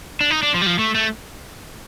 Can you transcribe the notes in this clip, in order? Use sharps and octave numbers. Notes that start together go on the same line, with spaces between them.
D4
D#4
D4
F3
G3
F3
A3
A3